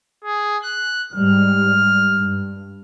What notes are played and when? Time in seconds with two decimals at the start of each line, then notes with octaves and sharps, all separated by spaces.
0.25 G#4
0.63 F#6
1.13 G#2 G3 F6
2.14 G2